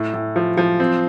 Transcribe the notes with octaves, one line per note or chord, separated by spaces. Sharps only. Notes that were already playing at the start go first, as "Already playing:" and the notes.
Already playing: A2
A2
F3
F3
C4